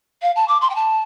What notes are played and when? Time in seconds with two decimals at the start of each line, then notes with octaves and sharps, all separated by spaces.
0.22 F5
0.36 A5
0.48 D6
0.61 C6
0.70 G5
0.75 A5